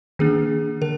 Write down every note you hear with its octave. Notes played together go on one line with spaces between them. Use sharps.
D#3 A#3 D4 G#4
D3 A#4